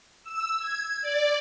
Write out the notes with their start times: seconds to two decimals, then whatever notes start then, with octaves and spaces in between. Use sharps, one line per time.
0.24 E6
0.59 G#6
1.02 D5